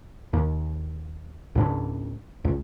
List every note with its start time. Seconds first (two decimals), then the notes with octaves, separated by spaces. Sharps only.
0.33 D#2
1.55 C#2 G#2 D4
2.45 C#2